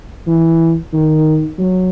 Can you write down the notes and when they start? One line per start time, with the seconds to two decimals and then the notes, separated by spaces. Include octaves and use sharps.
0.27 E3
0.93 D#3
1.59 F#3